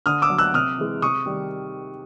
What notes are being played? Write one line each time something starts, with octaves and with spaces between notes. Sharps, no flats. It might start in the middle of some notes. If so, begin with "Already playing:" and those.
D3 D#6 F6
D6 E6
F#3
E6 F#6
C3 D#6 F6
E3 G#3
C3 C#6 D#6
D#3 G3